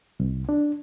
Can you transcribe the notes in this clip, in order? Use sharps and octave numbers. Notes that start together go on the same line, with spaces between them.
C2
D4